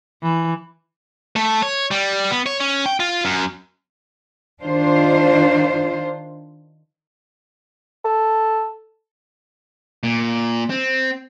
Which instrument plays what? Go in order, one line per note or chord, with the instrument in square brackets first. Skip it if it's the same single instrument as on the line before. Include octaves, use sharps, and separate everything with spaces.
[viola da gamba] E3
[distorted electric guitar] A3
C#5
G3
B3
C#5
C#4
G5
F4
F#2
[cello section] D#3 D4 F4 C5
[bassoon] A4
[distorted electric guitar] A#2
C4